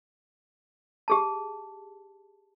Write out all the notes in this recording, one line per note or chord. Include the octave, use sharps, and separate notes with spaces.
G4 G#4 A5